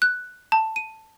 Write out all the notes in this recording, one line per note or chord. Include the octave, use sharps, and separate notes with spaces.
F#6
A5
D#7